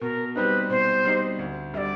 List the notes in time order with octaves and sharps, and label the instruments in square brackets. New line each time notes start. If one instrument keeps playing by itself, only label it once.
[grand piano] B2 [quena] A#4
[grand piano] G3 C4 D#4 [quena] B4
[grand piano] B2 [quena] C5
[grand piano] G3 C4 D#4
D2
[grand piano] D3 G3 [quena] E5
[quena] D5